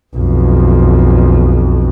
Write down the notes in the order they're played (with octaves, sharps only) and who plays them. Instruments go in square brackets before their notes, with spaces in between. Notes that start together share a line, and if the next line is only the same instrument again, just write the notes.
[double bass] B1 F2